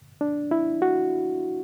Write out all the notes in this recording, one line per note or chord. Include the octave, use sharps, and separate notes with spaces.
D4
E4
F#4